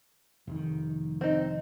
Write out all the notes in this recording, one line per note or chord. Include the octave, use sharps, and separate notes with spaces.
F1 D#3
C4 D#4